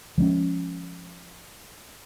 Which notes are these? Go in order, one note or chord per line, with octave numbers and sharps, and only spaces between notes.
F3 G#3 B3 C#4